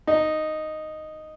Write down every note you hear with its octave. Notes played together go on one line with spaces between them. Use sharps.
D#4